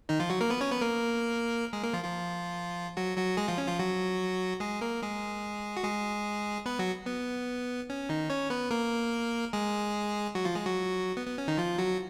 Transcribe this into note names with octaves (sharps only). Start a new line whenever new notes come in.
D#3 D#4
F3 F4
F#3 F#4
A#3 A#4
B3 B4
C#4 C#5
B3 B4
A#3 A#4
G#3 G#4
A#3 A#4
F3 F4
F3 F4
F#3 F#4
F#3 F#4
G#3 G#4
F3 F4
C#4
F3 F4
F#3 F#4
G#3 G#4
A#3 A#4
G#3 G#4
F#4
G#3 G#4
B3 B4
F#3 F#4
B3
C#4
D#3 D#4
C#4 C#5
B3 B4
A#3 A#4
G#3 G#4
F#3 F#4
F3 F4
G#3 G#4
F#3 F#4
B3
B3
C#4
D#3 D#4
F3 F4
F#3 F#4